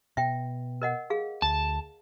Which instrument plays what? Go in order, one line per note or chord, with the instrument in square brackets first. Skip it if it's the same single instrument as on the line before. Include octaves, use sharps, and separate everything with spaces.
[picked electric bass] B2 [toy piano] E5 G5
[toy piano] A#4 D#5 F#5
G#4 F5
[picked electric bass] D2 [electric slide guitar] A5